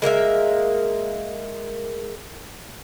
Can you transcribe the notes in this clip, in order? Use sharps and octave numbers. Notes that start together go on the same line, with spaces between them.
G#3 A#3 A#4 E5